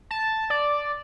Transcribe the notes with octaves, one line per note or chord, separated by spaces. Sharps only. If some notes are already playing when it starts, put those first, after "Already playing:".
A5
D5